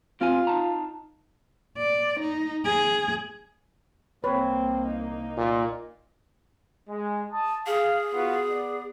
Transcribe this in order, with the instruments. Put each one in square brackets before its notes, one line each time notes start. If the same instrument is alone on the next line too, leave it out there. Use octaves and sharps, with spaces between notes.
[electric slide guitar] C4 G4 G#5 [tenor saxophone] F4
[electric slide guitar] D#4 A5 A#5
[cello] D5
D#4
G#4
[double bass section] C2 A#3 [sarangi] C4 [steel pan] B4 C#5
[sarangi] D#4
[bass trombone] A#2
[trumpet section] G#3
A5 D#6
[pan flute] G#4 [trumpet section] F5 G#5
[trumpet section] B3 F4 F#4
B3 D5